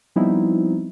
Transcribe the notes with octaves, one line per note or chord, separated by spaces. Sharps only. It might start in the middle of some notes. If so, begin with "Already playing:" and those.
F3 G3 B3 C4 D#4 E4